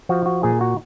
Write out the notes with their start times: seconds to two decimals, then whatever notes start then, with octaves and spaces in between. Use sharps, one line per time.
0.09 F3 F#4
0.26 F#4
0.43 A#2 G#4
0.61 F#4